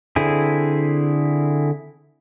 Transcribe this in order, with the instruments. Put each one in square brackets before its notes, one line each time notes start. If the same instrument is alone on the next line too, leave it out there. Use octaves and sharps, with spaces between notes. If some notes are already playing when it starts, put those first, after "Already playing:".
[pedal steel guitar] D3 C4 E4 G#4